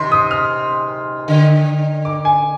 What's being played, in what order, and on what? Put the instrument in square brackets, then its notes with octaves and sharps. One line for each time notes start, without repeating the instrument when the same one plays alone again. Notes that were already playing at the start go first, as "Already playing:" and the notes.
Already playing: [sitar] C3 D#3 [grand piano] C6
[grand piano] D#6
F6
[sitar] D3
[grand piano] D6
G#5